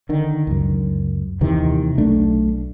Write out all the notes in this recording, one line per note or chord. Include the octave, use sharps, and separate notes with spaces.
D3 D#3
C#2 F#2
D#2 C3 D#3 E3
B1 A3 D4